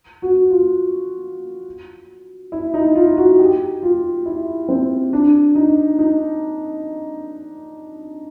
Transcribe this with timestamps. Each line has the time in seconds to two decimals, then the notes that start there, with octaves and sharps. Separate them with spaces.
0.22 F#4
0.50 F4
2.52 E4
2.74 D#4
2.95 F4
3.17 F#4
3.39 G4
3.83 F4
4.26 E4
4.69 C4
5.13 D4
5.55 D#4
5.99 D#4